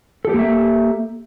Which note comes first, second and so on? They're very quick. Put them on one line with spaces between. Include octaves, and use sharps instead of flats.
A4 G4 A#3 E5